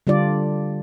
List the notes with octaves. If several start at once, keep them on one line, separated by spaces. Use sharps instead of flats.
D3 G3 D4 F4 D5